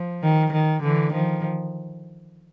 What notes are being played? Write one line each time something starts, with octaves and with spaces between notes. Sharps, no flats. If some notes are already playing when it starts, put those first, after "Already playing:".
Already playing: F3
D#3
D#3
D3 E3
D#3 F3